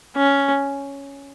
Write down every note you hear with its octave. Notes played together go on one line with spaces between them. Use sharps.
C#4